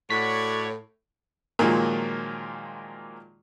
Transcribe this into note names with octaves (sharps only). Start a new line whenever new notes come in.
A2 F#4 C#5 D5 F#5 B6
A#2 D#3 F3 F#3 G#3 A#3